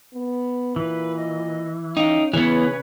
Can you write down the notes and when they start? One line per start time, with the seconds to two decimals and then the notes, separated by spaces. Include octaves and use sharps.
0.13 B3
0.76 A#2 E3 B4
1.15 D#5
1.97 C#4 D#4 F5 G5
2.33 C#3 E3 B3 B4 C#5